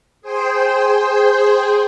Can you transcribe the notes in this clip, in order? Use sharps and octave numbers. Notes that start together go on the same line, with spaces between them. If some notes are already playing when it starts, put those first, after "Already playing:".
G#4 C5 G5 C6